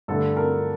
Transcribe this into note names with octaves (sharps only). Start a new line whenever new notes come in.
G2 D3 A3 A4
A#4